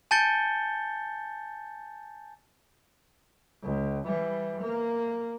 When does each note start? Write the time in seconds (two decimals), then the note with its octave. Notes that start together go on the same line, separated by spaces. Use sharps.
0.11 G#5 A5 G6 A6 C#7 G7
3.63 C#2
4.06 E3 G3
4.61 A#3